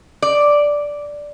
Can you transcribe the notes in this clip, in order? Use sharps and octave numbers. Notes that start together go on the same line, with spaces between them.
D5